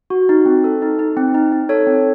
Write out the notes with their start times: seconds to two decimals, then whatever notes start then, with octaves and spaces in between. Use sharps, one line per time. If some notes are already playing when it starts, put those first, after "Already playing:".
0.10 F#4
0.29 D#4
0.46 C4
0.64 A4
0.82 D#4
0.99 D#4
1.17 C4
1.34 D#4
1.52 D#4
1.69 A4 C#5
1.87 C4